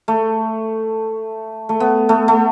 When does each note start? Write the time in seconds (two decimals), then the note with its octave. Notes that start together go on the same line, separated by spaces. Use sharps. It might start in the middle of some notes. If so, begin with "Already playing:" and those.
0.08 A3
1.69 A3
1.80 B3
2.09 A3
2.28 A3